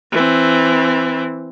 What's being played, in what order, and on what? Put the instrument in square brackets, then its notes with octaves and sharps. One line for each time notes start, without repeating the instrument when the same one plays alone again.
[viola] E3 C4